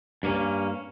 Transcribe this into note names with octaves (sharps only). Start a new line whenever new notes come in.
G2 A#3 C#4